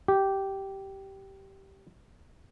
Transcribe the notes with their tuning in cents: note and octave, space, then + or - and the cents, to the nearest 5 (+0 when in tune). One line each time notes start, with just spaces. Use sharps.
G4 -10